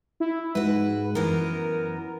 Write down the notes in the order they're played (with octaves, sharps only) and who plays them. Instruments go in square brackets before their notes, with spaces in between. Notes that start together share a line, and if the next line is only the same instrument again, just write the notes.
[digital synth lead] E4
[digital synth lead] G#2 [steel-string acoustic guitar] F#4 B4
[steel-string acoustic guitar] F#2 E3 B3 [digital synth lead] A#4